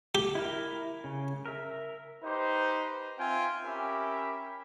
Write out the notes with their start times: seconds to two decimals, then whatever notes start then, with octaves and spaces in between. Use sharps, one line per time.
0.15 G4
0.35 E4 A#4
1.04 C#3
1.46 A#4 E5
2.24 D#4 G4 B4 C5
3.19 C4 F4 E5 G5 G#5
3.65 C#4 G4 A#4 E5 B5